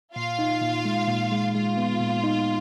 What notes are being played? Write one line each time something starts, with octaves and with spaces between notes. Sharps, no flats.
A#2 F4 F5
D#4
A#2
G#3
A#2
G#3
G#3 F4 F5
B3
A#2
D#4